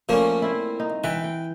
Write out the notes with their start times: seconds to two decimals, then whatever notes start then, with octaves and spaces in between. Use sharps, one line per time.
0.09 A#2 F3 A3 A#3 C#4
0.42 C4 E4
0.80 D#4
1.04 E3 B4 G5
1.24 G5